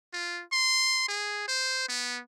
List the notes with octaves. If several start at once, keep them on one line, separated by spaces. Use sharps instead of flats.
F4
C6
G#4
C5
B3